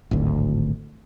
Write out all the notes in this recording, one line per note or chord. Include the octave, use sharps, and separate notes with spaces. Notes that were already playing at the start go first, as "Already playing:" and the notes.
D1 G#1 D2